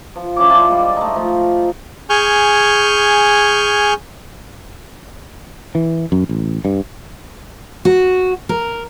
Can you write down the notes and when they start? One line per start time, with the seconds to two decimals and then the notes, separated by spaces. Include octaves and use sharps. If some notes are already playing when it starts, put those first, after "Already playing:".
0.16 F3
0.36 F3 C#4 E4 D6
0.50 D4 F4 C5 D5
0.68 G3 G#3
0.97 A3 D#4
1.16 F3
2.10 G#4 G#5 C#6 F6 G6
5.75 E3
6.12 F#2
6.29 A1
6.65 G2
7.85 F#4
8.49 A#4